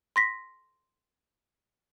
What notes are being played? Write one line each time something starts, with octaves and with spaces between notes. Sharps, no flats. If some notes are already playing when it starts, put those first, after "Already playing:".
C6 A#6 B6